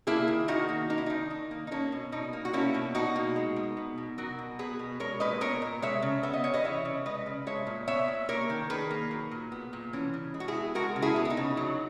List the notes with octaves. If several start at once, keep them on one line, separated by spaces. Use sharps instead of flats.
A#3 E4 G#4
D#3
D#3 D#4 F#4
A#3
A#3 D#4
E4
D#3 D#4
D#3 D#4
A#3
D#4
A#3 C#4
B2
B2 D#4
A#3
F#4
A#3 C#4 E4
B2
B2 D#4 F#4
A#3
G#3
B2
B3
B2
F#3 F#4 A#4
B2
B3 G#4 B4
B2
G#3 A#4 C#5
A#2 B4 D#5
B3 A#4 C#5
A#2
G#3 C#5 E5
C#3
B3 E5
D#5
C#3 C#5
B4 D#5
E3 C#5 E5
C#3
G#3 B4 D#5
C#3
G#3 C#5 E5
A#2
B3 C#5 E5
A#2
A#3 A#4 C#5
D#3
D#3 G#4 B4
A#3
F#3
A#2
B3
A#2
E3 C#4
C#3
G#3
F#4
E4 G#4
B3
G#3 F#4 A#4
C#3
E4 G#4
B3
E4
D#4
C#3
F#3